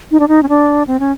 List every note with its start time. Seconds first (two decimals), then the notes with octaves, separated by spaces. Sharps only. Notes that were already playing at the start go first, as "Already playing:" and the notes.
0.11 D#4
0.20 D4
0.28 D#4
0.43 C#4
0.49 D4
0.87 C4
1.00 C#4